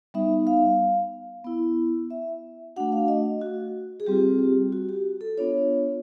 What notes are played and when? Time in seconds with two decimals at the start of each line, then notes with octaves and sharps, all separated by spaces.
0.14 G3 B3 D#4 E5
0.47 F5
1.44 B3 E4
2.10 E5
2.76 A3 D4 F#4 F#5
2.92 F5
3.08 D#5
3.41 F#4
4.00 G#4
4.06 G3 C4 F4 G4
4.39 G4
4.72 F#4
4.89 G4
5.21 A4
5.37 B3 D4 F4 C#5